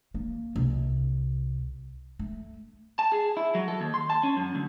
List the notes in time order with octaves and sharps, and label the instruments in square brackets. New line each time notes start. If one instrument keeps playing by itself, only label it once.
[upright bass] A#3
C2
A3
[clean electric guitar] A5
G#4
E4
F#3
A4
D#2
C6
A5
C#4
F#2
D2